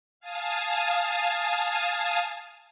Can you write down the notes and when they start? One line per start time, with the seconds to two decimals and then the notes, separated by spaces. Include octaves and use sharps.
0.20 F5 G#5 A5 D#6